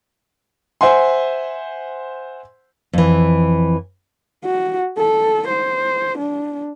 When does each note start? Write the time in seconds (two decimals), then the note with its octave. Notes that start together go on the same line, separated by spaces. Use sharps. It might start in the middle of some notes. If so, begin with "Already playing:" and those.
0.81 C5 E5 F#5 G#5 C6
2.93 F2 E3
4.45 F#4
4.98 A4
5.48 C5
6.18 D4